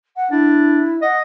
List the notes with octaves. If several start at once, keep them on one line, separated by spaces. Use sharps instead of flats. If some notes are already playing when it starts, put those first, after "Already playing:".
F#5
D4 E4
D#5 F#5